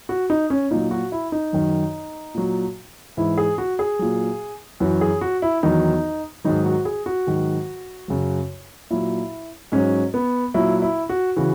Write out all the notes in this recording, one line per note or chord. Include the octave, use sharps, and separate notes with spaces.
F#4
D#4
C#4
A#2 F#3 D#4
F#4
E4
D#4
F#2 D#3 F#3
A#2 F#3
G#2 E3 E4
G#4
F#4
G#4
A#2 F#3
F#2 E3 F#4
G#4
F#4
E4
E2 D#3 F#3 D#4
G#2 D#3 F#3 D#4
F#4
G#4
F#4
G#2 D#3 F#3
F#2 C#3 F#3
A#2 F#3 E4
G#2 F#3 C#4
B3
A#2 F#3 E4
E4
F#4
C#3 E3 F#4